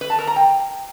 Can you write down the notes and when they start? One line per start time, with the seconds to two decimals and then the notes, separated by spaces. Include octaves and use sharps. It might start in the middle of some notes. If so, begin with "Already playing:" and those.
0.01 B4
0.10 A5
0.19 A#4
0.27 A#5
0.36 G5